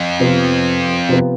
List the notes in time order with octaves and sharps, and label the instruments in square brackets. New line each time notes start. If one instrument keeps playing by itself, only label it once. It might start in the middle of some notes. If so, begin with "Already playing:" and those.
Already playing: [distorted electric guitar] F2
[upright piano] C3 F3 B3
C3 F3 B3